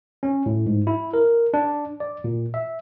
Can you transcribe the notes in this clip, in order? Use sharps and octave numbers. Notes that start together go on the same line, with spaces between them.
C#4
A2
G#2
E4
A#4
D4
D5
A#2
E5